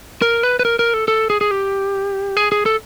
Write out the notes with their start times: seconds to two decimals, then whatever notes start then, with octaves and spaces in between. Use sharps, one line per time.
0.22 A#4
0.43 B4
0.59 B4
0.65 A#4
0.79 A#4
0.94 A4
1.08 A4
1.30 G#4
1.41 G#4
1.51 G4
2.37 G#4
2.52 G#4
2.66 A4